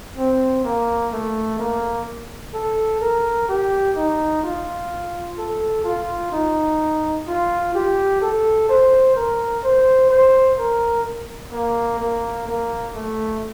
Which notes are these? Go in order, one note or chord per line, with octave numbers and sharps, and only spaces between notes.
C4
A#3
A3
A#3
A4
A#4
G4
D#4
F4
A4
F4
D#4
F4
G4
A4
C5
A#4
C5
C5
A#4
A#3
A#3
A#3
A3